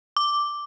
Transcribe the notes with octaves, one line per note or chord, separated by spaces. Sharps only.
D6